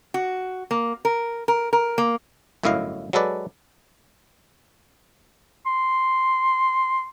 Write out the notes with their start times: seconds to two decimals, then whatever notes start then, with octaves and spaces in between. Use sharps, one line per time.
0.14 F#4
0.71 A#3
1.05 A#4
1.48 A#4
1.73 A#4
1.98 A#3
2.63 G1 F#2 A2 E4 D#5 F5
3.13 F#3 G#3 A4 B4 D5
5.66 C6